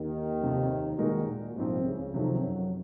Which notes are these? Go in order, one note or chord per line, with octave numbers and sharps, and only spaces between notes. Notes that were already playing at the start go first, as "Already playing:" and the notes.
Already playing: D#2 D#3
F2 C3 F3
D#2 A#2 D#3 G#3 D#4 F#4 A#4
A#2
C2 G#2 C3 F3 C4
C#2 C#3
F2 C3 D#3 F3 F#3
F#2 F#3